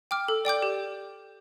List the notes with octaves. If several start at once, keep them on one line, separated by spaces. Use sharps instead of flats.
G5 D6 F6
A4
D5 G5 D6 G6
G4